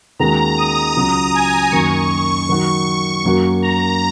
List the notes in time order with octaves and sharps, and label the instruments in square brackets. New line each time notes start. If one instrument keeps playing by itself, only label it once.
[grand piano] D#2 D#3 G#3 C#4 F#4 [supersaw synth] A#5
[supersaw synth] D#6
[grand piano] C#2 C#3 F#3 C#4 F#4
[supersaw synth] G#5
[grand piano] F#2 D#3 F#3 A#3 F#4 [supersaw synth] C#6
[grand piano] D#3 F#3 D#4 F#4
F#2 F#3 A#3 F#4
[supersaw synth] A#5